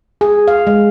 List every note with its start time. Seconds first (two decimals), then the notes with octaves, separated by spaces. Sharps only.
0.21 G#4
0.48 F5
0.67 G#3